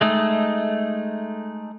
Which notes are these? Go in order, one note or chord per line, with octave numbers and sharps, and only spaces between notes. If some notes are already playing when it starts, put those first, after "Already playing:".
G#3 A3 D#4